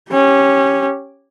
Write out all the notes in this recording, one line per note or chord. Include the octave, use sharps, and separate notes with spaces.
C#4 G4